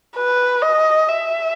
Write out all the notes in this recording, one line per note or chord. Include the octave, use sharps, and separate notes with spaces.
B4
D#5
E5